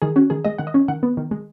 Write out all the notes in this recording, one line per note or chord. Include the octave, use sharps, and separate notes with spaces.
D#3 G#4
C#4 F#4
D#3 G#4
G#3 D#5
D#3 F#5
D#5
C#4
D#3 F#5
B3
D#3
G#3